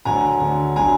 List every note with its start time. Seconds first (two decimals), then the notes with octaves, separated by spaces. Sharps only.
0.05 D2 D3 F#3 G#5 A#5
0.40 D2 D3 F#3
0.76 D3 F#3 G#5 A#5